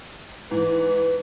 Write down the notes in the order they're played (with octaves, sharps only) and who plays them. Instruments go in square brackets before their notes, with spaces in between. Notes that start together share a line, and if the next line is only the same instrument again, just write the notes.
[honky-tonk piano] G#2 E3 [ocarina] B4